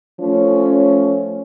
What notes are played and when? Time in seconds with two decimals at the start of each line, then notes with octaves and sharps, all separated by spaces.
0.20 F3 A3 C#4